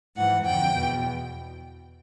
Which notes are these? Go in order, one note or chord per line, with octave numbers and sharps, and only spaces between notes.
G#2 E3 F#5
F2 D3 G5
E2 B2